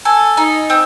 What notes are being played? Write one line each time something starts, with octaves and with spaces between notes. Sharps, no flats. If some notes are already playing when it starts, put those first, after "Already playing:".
A4 G#5
D#4
C4